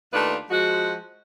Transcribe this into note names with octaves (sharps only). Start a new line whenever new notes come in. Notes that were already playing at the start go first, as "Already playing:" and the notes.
D#2 A3 D4 F4 B4 F5
F3 G#3 F#4